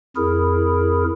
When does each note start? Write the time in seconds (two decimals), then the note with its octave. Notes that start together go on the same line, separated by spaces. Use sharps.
0.16 F2 E4 G#4 A#4